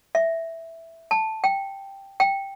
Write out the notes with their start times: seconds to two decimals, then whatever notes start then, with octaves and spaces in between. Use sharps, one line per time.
0.15 E5
1.11 A5
1.44 G5
2.20 G5